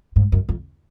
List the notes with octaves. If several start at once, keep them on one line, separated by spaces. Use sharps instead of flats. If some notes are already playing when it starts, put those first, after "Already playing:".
G#2
F#2
F2